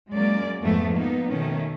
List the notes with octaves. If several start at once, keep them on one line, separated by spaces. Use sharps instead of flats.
F#3 G#3 A#3 C#4 D5
F2 G#2 F3 G#3 A3 B3
A#3 B3 D#4
B2 D#3 A3 C#4